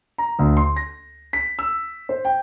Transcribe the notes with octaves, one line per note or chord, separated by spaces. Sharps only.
A#5
D2
C6
A#6
B6
E6
C5
G5